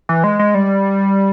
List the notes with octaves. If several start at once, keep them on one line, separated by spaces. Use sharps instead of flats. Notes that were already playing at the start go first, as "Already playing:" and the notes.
E3
G#3
G#3
G3